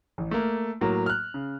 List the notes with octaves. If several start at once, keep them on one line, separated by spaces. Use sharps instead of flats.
A1
A3 A#3
A2 F#3 A#3
F6 F#6
C#3